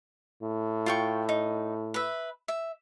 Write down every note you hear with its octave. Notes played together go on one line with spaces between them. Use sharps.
A2
F4 G5 C#6
D#4
B4 E5
E5